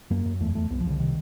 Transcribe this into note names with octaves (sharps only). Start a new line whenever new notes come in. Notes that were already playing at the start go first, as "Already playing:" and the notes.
F#2 A#3
F#2
E2 A3
E2 A3
C2 B3
F3
C2 D3
C3 D#3